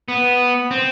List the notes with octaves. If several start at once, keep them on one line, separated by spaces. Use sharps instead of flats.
B3
C4